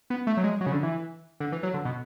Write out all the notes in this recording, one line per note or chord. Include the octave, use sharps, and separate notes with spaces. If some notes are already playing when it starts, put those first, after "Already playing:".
B3
A3
F#3
G#3
F#3
C#3
D3
E3
D3
E3
F#3
D3
B2